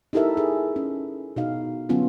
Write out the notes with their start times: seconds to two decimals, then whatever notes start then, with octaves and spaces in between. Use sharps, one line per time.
0.13 D#4 E4 G4 A4 A#4 E5
0.37 G#4
0.76 C#4
1.36 B2 D#4 F5
1.89 D3 F#3 B3 C#4 D4 F4